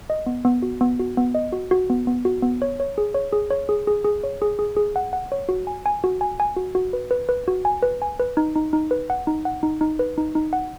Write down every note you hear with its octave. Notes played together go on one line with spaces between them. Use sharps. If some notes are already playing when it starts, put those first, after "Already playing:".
D#5
B3
B3
F#4
B3
F#4
B3
D#5
F#4
F#4
B3
B3
F#4
B3
C#5
C#5
G#4
C#5
G#4
C#5
G#4
G#4
G#4
C#5
G#4
G#4
G#4
F#5
F#5
C#5
F#4
G#5
G#5
F#4
G#5
G#5
F#4
F#4
B4
B4
B4
F#4
G#5
B4
G#5
B4
D#4
D#4
D#4
B4
F#5
D#4
F#5
D#4
D#4
B4
D#4
D#4
F#5